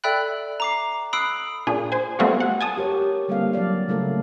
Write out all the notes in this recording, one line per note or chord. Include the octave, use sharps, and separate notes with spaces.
A4 D5 E5 G5 B5 F#6
A#5 D6 C7
B5 D#6 E6 F#6 C7 D7
A#2 D4 G#4
C5 G#5
G3 A3 B3 C4 F4 F#4
F#5
G#5 A5 D#6
G4 A#4 C#5
D3 G3 A#3 C4 A4 F5
F#3 G3 D5 F5
C#3 A3 E4 A4 A#4